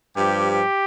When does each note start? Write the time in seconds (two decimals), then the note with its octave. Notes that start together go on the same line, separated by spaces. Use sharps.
0.16 G2 F3 G4
0.49 G4